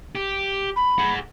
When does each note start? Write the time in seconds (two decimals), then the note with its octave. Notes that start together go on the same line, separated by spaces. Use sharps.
0.15 G4
0.76 B5
0.98 G#4 F#5